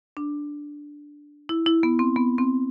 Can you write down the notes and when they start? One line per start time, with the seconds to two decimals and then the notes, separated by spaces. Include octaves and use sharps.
0.17 D4
1.49 E4
1.66 E4
1.83 B3
1.99 C4
2.16 B3
2.38 C4